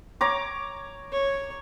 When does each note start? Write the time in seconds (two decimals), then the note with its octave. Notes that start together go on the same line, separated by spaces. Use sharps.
0.21 C#5 A#5 D6
1.12 C#5